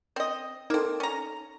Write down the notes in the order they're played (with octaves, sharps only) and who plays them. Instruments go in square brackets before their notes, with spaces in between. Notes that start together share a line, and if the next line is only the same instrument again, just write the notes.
[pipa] C4 D#5
[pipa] A#3 C4 [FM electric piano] D#4 A4
[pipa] C#4 A#5